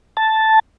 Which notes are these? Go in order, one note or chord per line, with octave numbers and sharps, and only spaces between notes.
A5